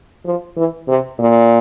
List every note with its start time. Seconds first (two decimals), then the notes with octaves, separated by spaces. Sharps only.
0.25 F3
0.57 E3
0.88 C3
1.19 A#2